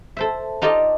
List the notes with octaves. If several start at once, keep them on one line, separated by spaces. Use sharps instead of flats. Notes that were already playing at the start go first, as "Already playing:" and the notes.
A4 C5 E5
D#4 F4 G4 A4 D5 D#5